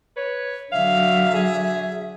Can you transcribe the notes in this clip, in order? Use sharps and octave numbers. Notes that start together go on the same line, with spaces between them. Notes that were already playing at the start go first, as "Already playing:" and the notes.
B4 C#5
D3 F#3 E5 F5
G#4